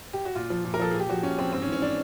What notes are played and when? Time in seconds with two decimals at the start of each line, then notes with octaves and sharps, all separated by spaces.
0.13 G4
0.25 F#4
0.35 A#2 F4
0.50 F3
0.65 A#2
0.74 A#4
0.79 F3 A4
0.91 G#4
0.95 A#2 G4
1.09 F3 F#4
1.23 A#2 C#4
1.38 F3 C4
1.53 G#2 C4
1.62 C#4
1.67 E3
1.72 C#4
1.82 D4